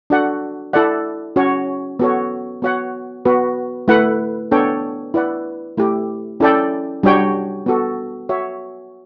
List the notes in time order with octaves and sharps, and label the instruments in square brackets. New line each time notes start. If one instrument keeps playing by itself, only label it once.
[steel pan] D4 F#4 A4 D5 F#5
E4 A4 D5 F#5
C#4 F#4 C#5
B3 F#4 A4 C#5
B3 F#4 C#5 F#5
B3 F#4 B4
A3 E4 B4 F#5
B3 D4 A4 C#5 G5
E4 B4 D5 F#5
A3 E4 G4
C#4 E4 A4 D5 G5
G3 D4 F#4 C#5 G5
B3 F#4 A4
F#4 C#5 E5